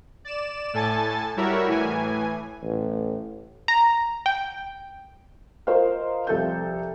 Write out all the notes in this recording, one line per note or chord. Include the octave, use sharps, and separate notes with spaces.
D5 E7
A2 A4 G#5 A5 A6
G3 E4 F#4 A#4 C#5 E5
A2 E3 G#5
A1
A#5
G5
F4 A#4 C5 D#5 F5
C2 F3 A4 E5 G6